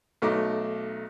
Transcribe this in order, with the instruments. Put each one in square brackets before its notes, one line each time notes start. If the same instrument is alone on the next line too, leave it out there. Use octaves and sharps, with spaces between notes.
[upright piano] B1 A3 D#4 D6